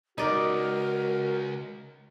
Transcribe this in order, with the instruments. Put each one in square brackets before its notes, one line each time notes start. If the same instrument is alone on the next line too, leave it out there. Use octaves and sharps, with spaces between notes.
[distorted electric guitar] C#2 [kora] D#4 D5 [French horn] F#4 [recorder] A#4